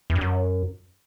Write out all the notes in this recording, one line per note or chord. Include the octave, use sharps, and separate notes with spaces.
E2
G2
F#2